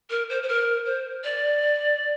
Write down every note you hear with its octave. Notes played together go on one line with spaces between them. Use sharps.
A#4
C5
C5
A#4
C5
D5